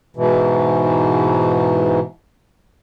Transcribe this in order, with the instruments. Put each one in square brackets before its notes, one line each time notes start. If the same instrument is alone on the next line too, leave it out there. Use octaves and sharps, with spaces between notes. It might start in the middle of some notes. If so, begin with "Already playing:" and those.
[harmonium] G#2 B2 E3